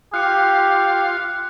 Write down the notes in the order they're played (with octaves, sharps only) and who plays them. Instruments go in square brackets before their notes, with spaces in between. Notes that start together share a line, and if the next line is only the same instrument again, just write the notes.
[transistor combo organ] F4 F5 [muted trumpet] G4 [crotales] F#6 C#7